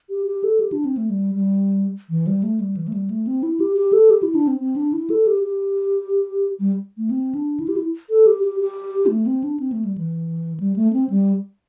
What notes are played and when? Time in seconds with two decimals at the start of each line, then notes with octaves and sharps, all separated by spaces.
0.10 G4
0.27 G4
0.44 A4
0.60 G4
0.72 D4
0.85 C4
0.97 A3
1.10 G3
1.35 G3
2.10 E3
2.27 G3
2.43 A3
2.60 G3
2.77 E3
2.88 A3
2.94 G3
3.10 A3
3.27 C4
3.43 E4
3.60 G4
3.77 G4
3.93 A4
4.10 G4
4.23 E4
4.35 D4
4.48 C4
4.60 C4
4.76 D4
4.93 E4
5.10 A4
5.27 G4
5.43 G4
6.60 G3
6.98 A3
7.10 C4
7.35 D4
7.60 E4
7.68 G4
7.77 E4
8.10 A4
8.27 G4
8.43 G4
8.60 G4
9.06 C4
9.10 A3
9.26 C4
9.44 D4
9.60 C4
9.72 A3
9.85 G3
9.98 E3
10.60 G3
10.76 A3
10.93 C4
11.10 G3